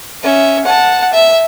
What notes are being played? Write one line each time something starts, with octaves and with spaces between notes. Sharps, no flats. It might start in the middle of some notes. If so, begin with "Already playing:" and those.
C#4 E5
F#5 A5
E5